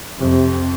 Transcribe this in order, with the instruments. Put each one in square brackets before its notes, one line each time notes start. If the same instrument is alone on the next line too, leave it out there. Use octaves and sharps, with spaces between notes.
[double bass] F2 [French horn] C3